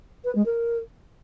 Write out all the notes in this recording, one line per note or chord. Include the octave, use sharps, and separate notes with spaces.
B4
G#3
A#4